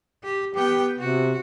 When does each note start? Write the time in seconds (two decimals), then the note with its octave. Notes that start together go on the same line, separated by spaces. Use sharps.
0.23 G4
0.55 B3 G4 G5
0.99 C3 F#4